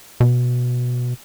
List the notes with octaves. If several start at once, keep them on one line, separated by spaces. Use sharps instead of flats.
B2